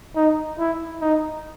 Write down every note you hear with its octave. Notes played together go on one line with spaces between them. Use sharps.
D#4
E4
D#4